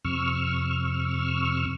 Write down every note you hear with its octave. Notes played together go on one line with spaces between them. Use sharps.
F2 C3 C#6 E6 F6